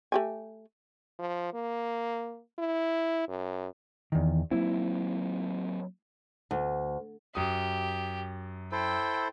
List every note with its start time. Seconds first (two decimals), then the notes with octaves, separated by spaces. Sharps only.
0.12 A3 G4 G#5
1.19 F3
1.54 A#3
2.59 E4
3.28 F#2
4.12 E2 D#3
4.51 F#3 A#3 C4 E4
6.51 D2
7.35 F#2 G4 D#6
8.72 E4 A4 C5 G5